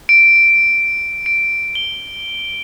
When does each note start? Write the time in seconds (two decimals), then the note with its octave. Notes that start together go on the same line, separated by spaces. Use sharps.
0.09 D7
0.36 D7
1.26 D7
1.75 G7